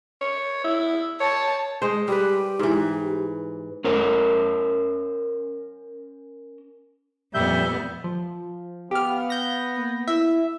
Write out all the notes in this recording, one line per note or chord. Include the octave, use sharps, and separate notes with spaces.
C#5
E4
C#5 A5
G#3 C5
G3 G4 B4
G#2 E3
C#4 A#4 C5
F2 A#2 G3 B3 E5 G6
F3
B3 G4 F5 F6
G6 A#6
A#3
E4 E5